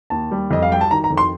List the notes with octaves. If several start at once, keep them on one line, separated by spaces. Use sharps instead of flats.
D#2 A5
G3
F2 D#5
F5
G3 G5
A5
D#3 A#5
A#5
F2
C6